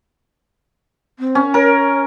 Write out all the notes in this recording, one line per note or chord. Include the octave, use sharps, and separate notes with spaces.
C4
C#4
A#4 C#5